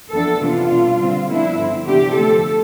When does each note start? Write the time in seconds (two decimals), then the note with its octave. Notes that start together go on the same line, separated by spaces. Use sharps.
0.11 F2 E3 B3 D4 A4
0.40 C3 E3 B3 D4 F4
0.70 B2 G3 D4
0.99 D3 G3 C4
1.28 D3 F3 B3 D4 E4
1.57 G2 D3 F3 C4
1.87 C3 E3 B3 D4 G4
2.15 D3 F3 A3 C4 A4